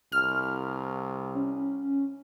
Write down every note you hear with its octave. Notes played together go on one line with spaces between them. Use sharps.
C2 F6
C#4